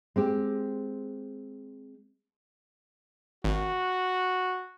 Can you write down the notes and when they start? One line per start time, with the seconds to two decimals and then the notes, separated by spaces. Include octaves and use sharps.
0.16 G#3 C4 G4
3.44 G#1 F#4